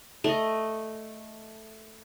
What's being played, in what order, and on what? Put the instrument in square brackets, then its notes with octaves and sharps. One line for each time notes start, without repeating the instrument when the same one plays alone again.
[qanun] A3 D#5